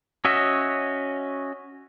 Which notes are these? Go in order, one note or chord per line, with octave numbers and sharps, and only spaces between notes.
C#4 F#4 D#5 E5